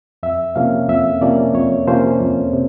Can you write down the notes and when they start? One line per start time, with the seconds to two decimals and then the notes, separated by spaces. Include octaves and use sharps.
0.23 F2 E5
0.56 C3 F3 A#3 C#4 F5
0.88 F2 E5
1.21 C3 F3 A#3 C#4 D5
1.54 F2 C#5
1.87 C3 F3 A#3 C#4 C5
2.20 F2
2.53 C3